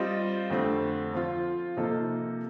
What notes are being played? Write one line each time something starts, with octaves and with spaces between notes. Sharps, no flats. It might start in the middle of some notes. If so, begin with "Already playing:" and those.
Already playing: G3 C4 F4 C5 D#5
F2 D3 A3 C4
F3 C4 F4
C3 F3 A#3 D#4 A4